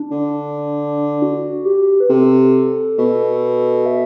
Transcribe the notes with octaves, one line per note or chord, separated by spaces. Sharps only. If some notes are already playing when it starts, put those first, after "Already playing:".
Already playing: D4
D3
F#4
G4
B4
C3 A4
B2
E5